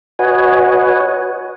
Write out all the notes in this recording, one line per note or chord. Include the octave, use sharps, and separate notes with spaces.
F#4 B4 C#5 D#5 F#5 G#5